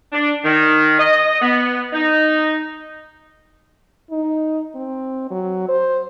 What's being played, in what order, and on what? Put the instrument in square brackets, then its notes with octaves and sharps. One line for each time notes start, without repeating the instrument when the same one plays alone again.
[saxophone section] D4
D#3
D#5
B3
D#4
[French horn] D#4
C4
F#3
C5